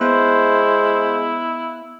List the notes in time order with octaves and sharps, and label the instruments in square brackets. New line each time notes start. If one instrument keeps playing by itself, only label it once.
[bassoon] G#3 [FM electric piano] B3 F5 F#6 [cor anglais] E4 [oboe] C5